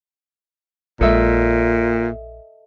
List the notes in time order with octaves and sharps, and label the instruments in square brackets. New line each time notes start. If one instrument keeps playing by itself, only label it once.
[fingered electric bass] A#1 G#3 [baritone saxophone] A#2 [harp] A4 D#5 E5